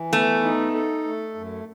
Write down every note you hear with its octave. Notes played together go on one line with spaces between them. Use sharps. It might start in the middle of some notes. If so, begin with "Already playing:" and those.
Already playing: E3
A3 B3
D#4
A4
A3
F#2